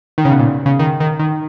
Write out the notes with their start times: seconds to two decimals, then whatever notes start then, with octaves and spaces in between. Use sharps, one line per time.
0.18 D#3
0.25 C#3
0.31 B2
0.39 A#2
0.66 C#3
0.79 D#3
1.00 D#3
1.19 D#3